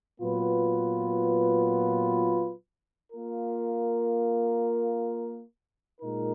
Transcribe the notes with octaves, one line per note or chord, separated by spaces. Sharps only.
A#2 F#3 B3 F4 B4
A#3 F4 A#4
A#2 G#3 D#4 A#4